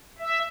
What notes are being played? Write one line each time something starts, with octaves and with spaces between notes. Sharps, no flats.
E5